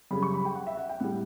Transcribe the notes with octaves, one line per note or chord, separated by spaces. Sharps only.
F#2 C#3 G3 B5
C#6
B5
G5
F#5
E5
F#5
G5
A2 G3 F#5